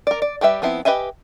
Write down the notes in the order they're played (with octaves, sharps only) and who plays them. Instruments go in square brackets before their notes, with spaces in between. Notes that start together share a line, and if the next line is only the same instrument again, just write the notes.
[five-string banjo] A#4 D5
D5
G3 G4 B4 E5
F3 B3 C4 E4
G4 B4 D#5 E5 G#5